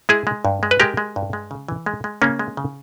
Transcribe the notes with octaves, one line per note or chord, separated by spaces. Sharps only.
G#3 E4 G#4
G#3
G2
G#3
B4
G#3 G4 A#4
G#3
G2
G#3
C#3
E3
G#3
G#3
C#3 A#3 C#4
G#3
C#3